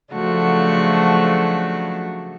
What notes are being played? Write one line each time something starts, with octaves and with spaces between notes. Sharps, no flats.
C#3 F3 F#3 A3 D4 F#4